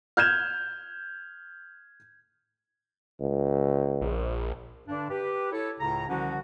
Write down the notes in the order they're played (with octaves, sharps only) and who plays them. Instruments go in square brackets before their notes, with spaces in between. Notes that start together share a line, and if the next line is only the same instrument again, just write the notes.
[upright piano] F6 G6 G#6 E7
[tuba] C#2
[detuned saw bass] A#1
[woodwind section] G2 D3 D4
G4 B4
E4 A4 C#5
C#2 A2 C#3 A#5
C2 D3 D#3 F3 C#4 F#4